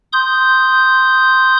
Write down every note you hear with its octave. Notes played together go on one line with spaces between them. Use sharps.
C6 D#6 G6